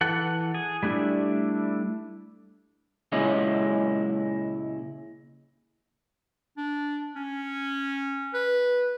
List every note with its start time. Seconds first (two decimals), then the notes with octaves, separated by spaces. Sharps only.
0.01 E3 A4 F#5
0.55 G#4
0.83 G3 A3 D4 E4
3.12 C#2 A#2 G#3 C#4 E4 D#5
6.57 D4
7.16 C#4
8.34 B4